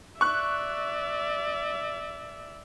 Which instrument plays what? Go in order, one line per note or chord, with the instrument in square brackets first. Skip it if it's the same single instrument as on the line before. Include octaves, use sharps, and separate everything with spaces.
[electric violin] D5 E5 [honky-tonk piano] C#6 F#6